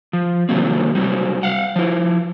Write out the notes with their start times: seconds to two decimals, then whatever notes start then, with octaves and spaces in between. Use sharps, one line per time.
0.13 F3
0.49 C3 D#3 F#3 G3 A#3 C4
0.95 C3 F#3 G3
1.43 F5 F#5
1.76 F3 E4